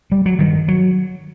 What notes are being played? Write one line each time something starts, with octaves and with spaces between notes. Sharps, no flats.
G3
F#3
G2 D#3
F#3